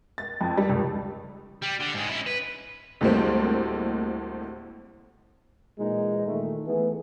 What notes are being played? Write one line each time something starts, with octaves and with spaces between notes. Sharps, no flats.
A6
F2
G3
C#2
G3
D3
G#2 G#3
C#4 E4
B4
D2 A2 G3 G#3 A#3 C4
A#2 E3 G#3 D#4
A#2 D#3 A3
E3 A3 B3 G#4